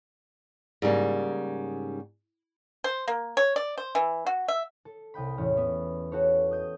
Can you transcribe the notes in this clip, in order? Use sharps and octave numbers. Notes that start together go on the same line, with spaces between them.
G#2 C#3 G3 A#3
C5
A#3
C#5
D5
C5
E3
F#4
E5
A4
C2 D#5 G5 B5
E2 A2 C#4
B3
F#4 G4 A4 C#5
D#5 G6 D#7